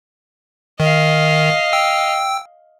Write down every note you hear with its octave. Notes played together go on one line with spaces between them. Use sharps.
D#3 D#5 F5
G5 E6